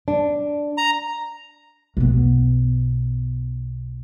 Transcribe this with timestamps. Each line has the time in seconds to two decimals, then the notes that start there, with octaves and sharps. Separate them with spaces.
0.08 D4
0.78 A#5
1.97 B1 B3